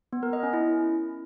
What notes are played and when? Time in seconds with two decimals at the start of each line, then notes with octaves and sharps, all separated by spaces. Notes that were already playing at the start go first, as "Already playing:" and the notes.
0.13 B3
0.23 A#4
0.33 D#5
0.43 C#4
0.53 E4